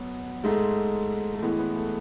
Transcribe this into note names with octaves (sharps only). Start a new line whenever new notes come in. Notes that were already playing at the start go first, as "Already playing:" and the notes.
Already playing: B2 F#3 B3
G#2 G#3 A3
A3
A2 E3 G#3 B3
B3
A3